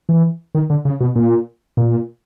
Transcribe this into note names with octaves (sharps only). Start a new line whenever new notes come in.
E3
D#3
D3
C#3
B2
A#2
A#2